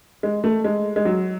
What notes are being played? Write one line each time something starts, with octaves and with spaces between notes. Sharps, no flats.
G#3
A3
G#3
G#3
F#3